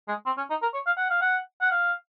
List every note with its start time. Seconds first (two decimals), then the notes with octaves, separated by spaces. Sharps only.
0.08 G#3
0.26 C4
0.37 C#4
0.50 D#4
0.62 A#4
0.74 C#5
0.87 F5
0.98 F#5
1.10 F5
1.22 F#5
1.62 F#5
1.71 F5